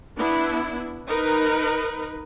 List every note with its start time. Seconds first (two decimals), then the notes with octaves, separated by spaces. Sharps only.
0.17 B3 D4 E4
1.06 D#4 A#4 B4